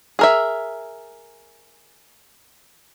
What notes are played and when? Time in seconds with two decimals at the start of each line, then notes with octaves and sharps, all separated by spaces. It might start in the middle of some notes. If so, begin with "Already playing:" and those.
0.19 G#4 A#4 E5